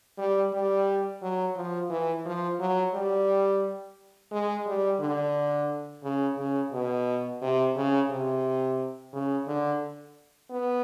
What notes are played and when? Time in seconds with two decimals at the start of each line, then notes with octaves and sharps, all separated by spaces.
0.18 G3
0.54 G3
1.22 F#3
1.56 F3
1.90 E3
2.25 F3
2.60 F#3
2.94 G3
4.32 G#3
4.66 G3
5.00 D3
6.04 C#3
6.37 C#3
6.73 B2
7.42 C3
7.76 C#3
8.10 C3
9.13 C#3
9.48 D3
10.51 B3